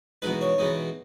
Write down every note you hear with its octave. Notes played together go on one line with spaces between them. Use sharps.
E2 B2 G#3 D#4 B4
C#5
E2 B2 G#3 D#4